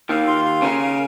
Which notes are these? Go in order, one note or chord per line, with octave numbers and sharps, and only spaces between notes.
D#2 D#3 F5
F4
F5
C#3 C#4 A#4
F5